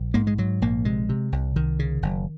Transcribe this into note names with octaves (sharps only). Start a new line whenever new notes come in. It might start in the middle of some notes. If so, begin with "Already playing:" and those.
Already playing: A#1
G#2 A#3
G#3
G#2 F#3
A#1 A#3
C3 G#3
C3
C2
C2 D#3
C#3
F#1